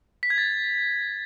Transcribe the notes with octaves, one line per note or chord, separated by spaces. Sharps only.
B6
G#6
A6